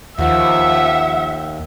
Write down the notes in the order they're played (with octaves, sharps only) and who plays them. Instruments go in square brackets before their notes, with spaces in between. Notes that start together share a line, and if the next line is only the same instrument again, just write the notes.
[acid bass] D#2 [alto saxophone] F3 [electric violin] E5 [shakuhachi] F#5